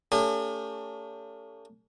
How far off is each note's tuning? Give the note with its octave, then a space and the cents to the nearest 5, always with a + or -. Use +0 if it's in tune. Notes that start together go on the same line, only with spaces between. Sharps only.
A3 +40 C#4 +45 G#4 -45